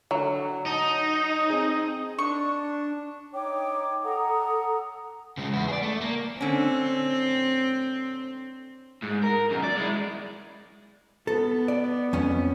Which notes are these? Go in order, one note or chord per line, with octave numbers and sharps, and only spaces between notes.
D3 F#3
D#4 C#5 D#5 A5 D#6
C4 G#4
D4 C#6
D#4 C#5 G5 D6
A4 F#5 A#5 D#6
C#3 G#3
E2 B3
G#4 D5
A3
A#3
D3 C4 C#4
G#2
A#4
F#2 B2
D5
G#3 E4
B3 A4
D5
F2 C#4